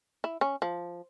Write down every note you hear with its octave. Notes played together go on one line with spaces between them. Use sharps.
E4
C#4
F3